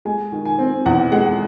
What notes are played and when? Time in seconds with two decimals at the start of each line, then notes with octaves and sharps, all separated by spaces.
0.05 G#3 G#5
0.32 D#3
0.45 G#5
0.59 C4
0.86 E2 F#5
1.12 G#3 F#5